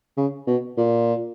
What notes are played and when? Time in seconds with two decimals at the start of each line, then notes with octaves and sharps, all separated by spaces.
0.17 C#3
0.47 B2
0.77 A#2